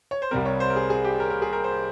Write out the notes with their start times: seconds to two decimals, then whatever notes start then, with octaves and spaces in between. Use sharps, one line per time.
0.11 C#5
0.22 C5
0.31 C2 C3 G3 C4 A#4
0.45 C#5
0.60 C5
0.70 A#4
0.76 G#4
0.90 G#4
1.05 G4
1.20 A#4
1.30 A#4
1.42 G#4
1.53 A#4
1.64 C5